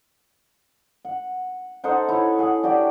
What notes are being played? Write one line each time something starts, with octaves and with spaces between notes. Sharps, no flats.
F#5
D#4 A4 C5 F#5
E4 C#5
G#4 F#5
D4 F#4 G4 D5